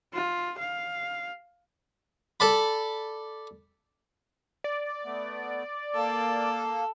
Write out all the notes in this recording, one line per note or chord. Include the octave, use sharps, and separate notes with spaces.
F4
F5
A4 D5 B5
D5
A3 B3
A#3 A4